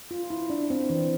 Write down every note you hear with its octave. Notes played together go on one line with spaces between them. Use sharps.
F4
E4
D4
C4
E3